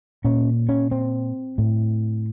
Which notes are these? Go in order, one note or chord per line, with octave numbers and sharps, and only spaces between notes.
A#2 C#4
C#4
C4
A2